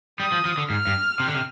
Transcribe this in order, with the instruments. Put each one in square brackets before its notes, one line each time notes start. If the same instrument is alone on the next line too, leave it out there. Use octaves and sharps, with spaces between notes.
[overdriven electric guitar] G3 [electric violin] D#6
[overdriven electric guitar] F3
F3
D3
[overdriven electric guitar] G#2 [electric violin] F6
[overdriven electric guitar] G2
C3
D3
C3